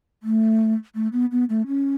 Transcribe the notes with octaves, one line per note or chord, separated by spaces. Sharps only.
A3
A3
B3
B3
A3
C#4